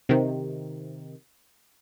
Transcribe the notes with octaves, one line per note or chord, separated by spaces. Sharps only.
C3 D#3